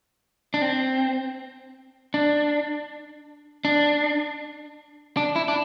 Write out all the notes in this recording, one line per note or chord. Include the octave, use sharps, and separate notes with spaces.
D4
C4
D4
D4
D4
E4
D4